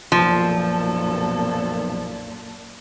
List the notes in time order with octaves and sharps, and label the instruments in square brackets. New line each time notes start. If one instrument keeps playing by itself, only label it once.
[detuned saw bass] B1 [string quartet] F#2 A#2 A4 [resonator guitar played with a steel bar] F3